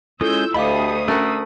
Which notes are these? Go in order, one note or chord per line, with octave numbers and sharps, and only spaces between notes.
G#3 C#4 E4 F4 A4 D#6 E6 G6
D2 G4 A4 D#5 F5 B5 D6 D#6
A3 C#4 A#4 F#5 E6